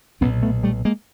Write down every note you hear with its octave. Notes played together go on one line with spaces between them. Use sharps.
B1 A#2 B3 C#4
A3 B3
G3 A3
G#3 A#3